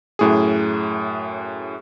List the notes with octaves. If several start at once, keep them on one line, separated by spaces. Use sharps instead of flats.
F#2 A2 G#4